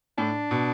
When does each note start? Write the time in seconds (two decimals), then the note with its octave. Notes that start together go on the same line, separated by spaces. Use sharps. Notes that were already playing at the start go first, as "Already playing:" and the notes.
0.18 A2 D4
0.51 B2